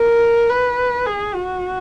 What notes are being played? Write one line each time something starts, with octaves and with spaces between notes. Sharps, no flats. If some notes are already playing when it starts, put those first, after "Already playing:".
Already playing: A#4
B4
G#4
F#4